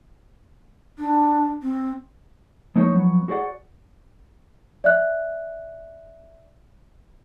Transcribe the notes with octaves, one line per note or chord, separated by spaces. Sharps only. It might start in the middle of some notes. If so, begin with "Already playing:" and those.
D4
C4
F3 G#3 A#3 D#4 C5 C#5
F3 F#3 B3
F#4 G#4 C5 D5 F#5
D5 E5 F#6